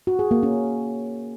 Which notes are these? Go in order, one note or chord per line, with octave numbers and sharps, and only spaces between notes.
F#4
G#4
A#3
C#4